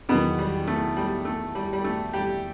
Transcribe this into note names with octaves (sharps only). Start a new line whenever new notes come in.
E2 B2 D#3 F#3 B3
G3
A3
G3
A3
G3
G3
A3
G3 G4